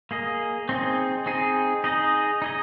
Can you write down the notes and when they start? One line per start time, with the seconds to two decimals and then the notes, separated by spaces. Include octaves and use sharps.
0.11 A#3 G#4 D#5
0.69 C4 D#4 G#4
1.26 C4 D#4 G#4
1.84 D#4 G#4 D#5
2.42 D#4 G#4 D#5